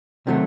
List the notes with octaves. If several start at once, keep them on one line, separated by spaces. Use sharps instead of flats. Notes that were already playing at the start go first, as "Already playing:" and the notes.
C3 D#3 F#3 A3